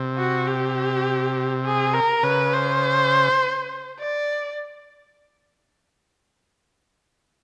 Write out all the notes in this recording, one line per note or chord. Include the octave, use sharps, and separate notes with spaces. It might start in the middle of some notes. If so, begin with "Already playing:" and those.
Already playing: C3
F#4
G4
G#4
A#4
C#3 B4
C5
D5